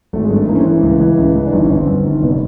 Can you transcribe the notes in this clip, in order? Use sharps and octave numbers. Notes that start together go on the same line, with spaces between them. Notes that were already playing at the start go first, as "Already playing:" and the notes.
G#1 A3
G#3
G2
A3
E3 A#3
C#4
C4
E3
C#2
E3
C#2
E3
D4
G1 D#4
C#4
G1
C4
G1
D#3
F1 B3